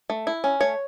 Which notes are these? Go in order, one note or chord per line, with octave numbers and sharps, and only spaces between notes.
A3
E4
C#4
A3 C#5